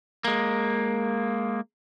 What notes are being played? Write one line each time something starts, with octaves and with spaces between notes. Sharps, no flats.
G#3 A#3